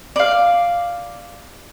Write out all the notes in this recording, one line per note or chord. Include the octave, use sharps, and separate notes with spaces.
D5 F5